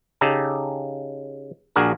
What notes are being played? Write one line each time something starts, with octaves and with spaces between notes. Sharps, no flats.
C#3 D#4 G4 A4
A#1 D4 F#4 G#4 A#4